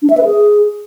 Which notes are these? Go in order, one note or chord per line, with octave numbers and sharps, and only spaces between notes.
D4
E5
B4
G#4